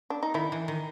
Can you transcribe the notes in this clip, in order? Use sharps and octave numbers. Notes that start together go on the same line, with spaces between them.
D4
D#4
D#3 E4
E3
D#3